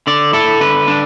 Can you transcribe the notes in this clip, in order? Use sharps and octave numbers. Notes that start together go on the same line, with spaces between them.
D3 D5
E4 A4
D3 B4
D4